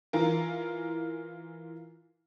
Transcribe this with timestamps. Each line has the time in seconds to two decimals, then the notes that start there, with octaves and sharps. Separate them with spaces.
0.13 E3 F4 A#4